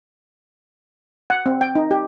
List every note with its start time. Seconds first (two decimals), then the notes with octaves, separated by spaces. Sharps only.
1.30 F#5
1.46 C4
1.61 G5
1.75 D#4
1.91 G4